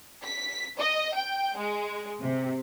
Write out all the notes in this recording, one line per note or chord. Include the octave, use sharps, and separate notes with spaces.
B6
D#5
G5
G#3
C3